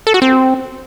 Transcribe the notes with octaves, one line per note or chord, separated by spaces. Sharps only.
A4
F#4
C4